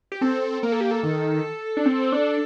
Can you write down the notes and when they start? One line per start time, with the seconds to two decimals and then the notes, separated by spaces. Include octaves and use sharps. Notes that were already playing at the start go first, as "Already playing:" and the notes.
0.12 G4
0.21 C4 A4
0.63 A#3 A#4
0.72 A4
0.81 G4
0.91 A4
1.03 D#3
1.77 D4
1.86 C4
2.12 D4